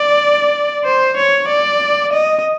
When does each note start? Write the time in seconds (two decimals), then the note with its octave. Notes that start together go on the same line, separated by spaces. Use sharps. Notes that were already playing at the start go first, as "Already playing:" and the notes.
Already playing: D5
0.85 C5
1.17 C#5
1.49 D5
2.13 D#5